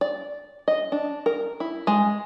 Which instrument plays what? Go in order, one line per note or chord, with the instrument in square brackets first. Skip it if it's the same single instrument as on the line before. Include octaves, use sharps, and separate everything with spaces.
[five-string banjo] D5
D#5
D4
A#4
E4
G#3